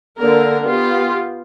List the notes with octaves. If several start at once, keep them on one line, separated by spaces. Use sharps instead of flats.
D3 A#3 A#4
B3 F4 G4